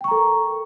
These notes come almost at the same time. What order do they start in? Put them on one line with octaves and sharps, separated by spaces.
G5 C#6 A#5 A4 A#4